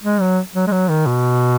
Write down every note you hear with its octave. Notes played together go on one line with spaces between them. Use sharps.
G#3
F#3
F#3
G#3
F#3
D#3
B2